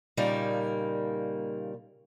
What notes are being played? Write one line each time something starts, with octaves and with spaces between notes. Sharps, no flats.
A#2 C#3 G3 A#3 D#4